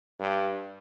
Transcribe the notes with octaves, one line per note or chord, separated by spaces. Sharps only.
G2